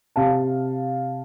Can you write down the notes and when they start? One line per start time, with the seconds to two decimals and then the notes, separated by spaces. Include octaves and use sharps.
0.16 C3 F5 A5